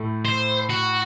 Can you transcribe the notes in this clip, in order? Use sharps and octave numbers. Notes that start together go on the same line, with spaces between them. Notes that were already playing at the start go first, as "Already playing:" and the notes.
Already playing: A2 A3
C5
F#4